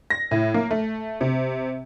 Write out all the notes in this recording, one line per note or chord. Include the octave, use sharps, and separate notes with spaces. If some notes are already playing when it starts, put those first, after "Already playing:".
A#6
A2
A#3
A3
C3